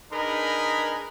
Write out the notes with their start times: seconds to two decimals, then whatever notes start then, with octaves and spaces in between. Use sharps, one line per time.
0.11 D4 D#4 G#4 A#4 B4 B5